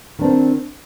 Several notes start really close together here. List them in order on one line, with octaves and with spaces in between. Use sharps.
D#3 D4 C4